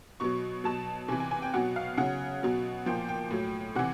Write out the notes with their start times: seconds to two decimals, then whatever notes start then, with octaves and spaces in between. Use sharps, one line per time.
0.20 B2 F#3 C#6
0.64 B2 F#3 A5
1.08 C3 G#5
1.12 E3
1.20 G#5
1.31 G#5
1.42 G5
1.54 B2 F#3 F#5
1.76 F5
1.97 C#3 F#3 F#5
2.43 B2 F#3
2.86 A#2 F3 G5
3.08 G5
3.31 A2 F#3
3.76 C3 E3 F#5